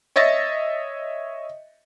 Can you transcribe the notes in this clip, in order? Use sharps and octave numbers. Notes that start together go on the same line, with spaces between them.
C#5 D#5 E5 A6 A#6